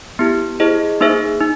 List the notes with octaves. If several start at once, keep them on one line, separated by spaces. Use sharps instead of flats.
B3 E4 G4
E4 G#4 C5 D#5
A#3 D#4 G#4 C5 E5
D#4